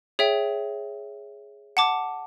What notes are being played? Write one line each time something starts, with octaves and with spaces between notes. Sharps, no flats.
G#4 C#5 E5 G5
F#5 A5 D6